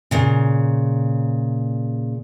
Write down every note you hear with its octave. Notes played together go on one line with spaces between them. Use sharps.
A#2 C#3